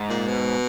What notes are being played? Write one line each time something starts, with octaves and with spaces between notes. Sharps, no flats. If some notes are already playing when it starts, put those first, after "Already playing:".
Already playing: G#2
A#2
B2